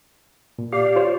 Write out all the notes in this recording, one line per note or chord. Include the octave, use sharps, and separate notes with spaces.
A#2
G4 D5 F5
F4 C5 C#5